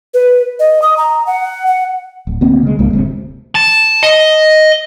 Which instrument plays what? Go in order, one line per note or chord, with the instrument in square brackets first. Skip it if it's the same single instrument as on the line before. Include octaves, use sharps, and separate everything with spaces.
[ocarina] B4
D#5
D#6
A#5
F#5
F#5
[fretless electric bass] D1
D2 A#3 C4 C#4
C#3 G#3
C2 G2 G#3 A#3
D1 D2 A2 C3
[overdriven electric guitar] A5
D#5